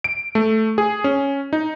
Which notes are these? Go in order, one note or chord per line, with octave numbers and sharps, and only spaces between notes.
D7
A3
G#4
C#4
D#4